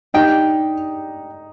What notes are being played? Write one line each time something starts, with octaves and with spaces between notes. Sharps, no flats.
D4 D#4 G4 D5 G5